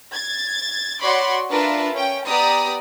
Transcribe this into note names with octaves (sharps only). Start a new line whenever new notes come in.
G#6 A6
F#4 C#5 D5 B5 C6 D6
D4 F4 A#4 B4 E5 A5
C#4 G5
B3 G4 D5 A#5 D#6